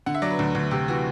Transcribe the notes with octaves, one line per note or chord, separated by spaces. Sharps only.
D3 F#5
E5
F#3 D5
B4
D2
D2
C3 G4
E3 F#4